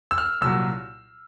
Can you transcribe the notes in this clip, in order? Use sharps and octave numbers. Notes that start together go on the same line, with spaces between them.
E6
F6
C2 A#2 F#3 E6